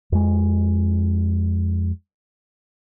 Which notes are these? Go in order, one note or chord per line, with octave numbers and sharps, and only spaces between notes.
F2 G#3